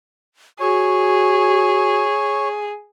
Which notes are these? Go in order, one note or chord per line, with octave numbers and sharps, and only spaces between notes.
F#4 G#4 C#5